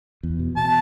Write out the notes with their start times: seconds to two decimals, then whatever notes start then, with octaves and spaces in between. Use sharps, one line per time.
0.23 E2
0.39 B2
0.56 B2 A5